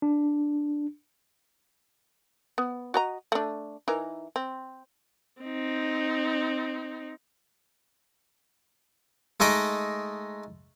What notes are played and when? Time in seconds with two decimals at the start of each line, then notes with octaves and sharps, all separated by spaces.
0.02 D4
2.58 B3
2.94 F#4 D#5 A#5
3.32 A3 D4
3.88 E3 D#4 A#4
4.36 C4
5.42 C4 D#4
9.40 G#3 A3 D#4 D#5 D6